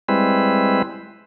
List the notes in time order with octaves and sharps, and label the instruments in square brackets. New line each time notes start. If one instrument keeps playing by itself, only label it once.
[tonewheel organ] G3 G#3 C4 E4 B4